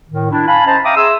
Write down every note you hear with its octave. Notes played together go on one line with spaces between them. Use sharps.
A2 D#3
D4 E4
F5 G#5 A5 B5
C#4 C5 D#5 A5 A#5
E5 F5 G5 A#5 D6 D#6
G#4 E5 C6 E6